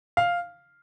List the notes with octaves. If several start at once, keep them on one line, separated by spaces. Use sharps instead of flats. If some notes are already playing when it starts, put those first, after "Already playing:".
F5